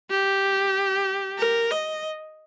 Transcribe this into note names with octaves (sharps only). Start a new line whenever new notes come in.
G4
A#4
D#5